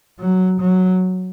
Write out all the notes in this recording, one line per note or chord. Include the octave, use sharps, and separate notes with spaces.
F#3
F#3